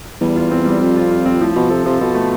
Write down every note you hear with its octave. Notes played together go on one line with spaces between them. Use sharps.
E2 G3
F4
C4
G3
F2 G3
F4
F4
C4
A2 F3
B2 F3
C3 A4
C3 F3
B2 A4
A3